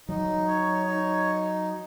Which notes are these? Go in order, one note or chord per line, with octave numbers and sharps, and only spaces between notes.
F#3 D#4
C#5
D#4